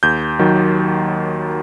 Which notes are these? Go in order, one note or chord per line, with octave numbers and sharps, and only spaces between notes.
D#2 G6
D#3 F#3